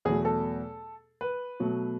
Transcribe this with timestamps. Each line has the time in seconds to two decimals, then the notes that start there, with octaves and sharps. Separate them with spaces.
0.05 E2 B2 F#3 A3 G#4
0.25 A4
1.21 B4
1.60 B2 F#3 A3